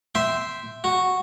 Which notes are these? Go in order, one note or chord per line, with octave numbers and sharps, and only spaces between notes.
E5 G5 C6
F#4